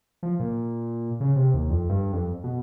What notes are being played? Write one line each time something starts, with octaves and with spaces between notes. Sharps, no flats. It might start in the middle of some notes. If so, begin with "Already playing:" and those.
F3
A#2
C#3
C3
D#2
F2
G2
F2
B2